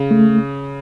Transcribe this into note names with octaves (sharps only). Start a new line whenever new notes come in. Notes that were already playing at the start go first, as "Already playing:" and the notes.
Already playing: C#3
A3